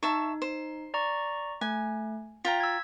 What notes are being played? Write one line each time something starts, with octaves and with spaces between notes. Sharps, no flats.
D#4 E5 A5 C#6
C5
D5 A#5 C#6
A3 G#5
F4 G5 A#5 B6
E6 G#6